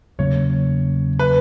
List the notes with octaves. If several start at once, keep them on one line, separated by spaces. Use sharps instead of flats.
E2 C#3 F#3 A#3 C#5
B4